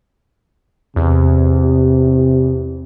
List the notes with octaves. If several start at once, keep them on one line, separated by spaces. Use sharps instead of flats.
E2 C3